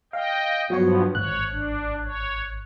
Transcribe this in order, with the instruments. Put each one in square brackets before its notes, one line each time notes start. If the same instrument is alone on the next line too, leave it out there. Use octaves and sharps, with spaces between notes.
[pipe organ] D#5 G5 [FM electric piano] F5
[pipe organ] G2 F3 B3 [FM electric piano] F#3 F#4 C#5
[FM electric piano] G#1 F#6 [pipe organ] C#5
[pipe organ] D4
C#5